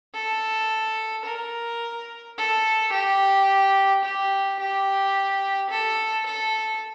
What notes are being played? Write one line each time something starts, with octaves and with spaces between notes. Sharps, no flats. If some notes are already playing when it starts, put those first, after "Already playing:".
A4
A#4
A4
G4
G4
G4
A4
A4